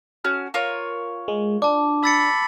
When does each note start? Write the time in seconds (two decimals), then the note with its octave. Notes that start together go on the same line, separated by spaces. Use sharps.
0.24 C#4 F#4 F6
0.54 F4 A#4 C#5
1.28 G#3
1.62 D4 A5 D6
2.04 B5 E6 A6 C#7